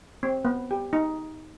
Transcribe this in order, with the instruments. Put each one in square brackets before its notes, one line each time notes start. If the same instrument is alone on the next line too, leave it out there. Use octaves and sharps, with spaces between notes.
[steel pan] C4
B3
G4
D#4